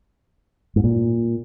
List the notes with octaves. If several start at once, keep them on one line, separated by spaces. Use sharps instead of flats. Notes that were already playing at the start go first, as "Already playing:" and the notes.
G#2
A#2